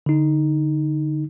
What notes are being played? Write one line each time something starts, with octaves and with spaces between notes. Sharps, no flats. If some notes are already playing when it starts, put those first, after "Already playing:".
D3 D#4